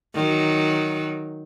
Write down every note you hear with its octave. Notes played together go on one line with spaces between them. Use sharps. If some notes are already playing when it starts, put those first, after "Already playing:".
D#3 F#3